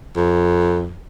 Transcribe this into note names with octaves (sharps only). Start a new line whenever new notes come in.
F2